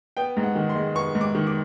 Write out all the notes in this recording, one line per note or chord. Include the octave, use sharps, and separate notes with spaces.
B3 G5
G#2
F#5
D#3
C6
G#3
B3 C#6
G#2
D6
D#3
D6